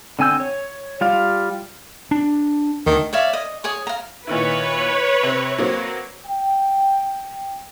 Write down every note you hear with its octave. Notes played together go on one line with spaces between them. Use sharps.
D3 C4 G#5 E6 G6
C#5
G3 F4 D5 F5
D4
D2 D#3
C#5 D5 E5 F5
D#5
G#4 C#5 D#6
F5 A#5
A#2 D#3 E4 B4 C#5
C3 C4
F#3 A#3 C4
G5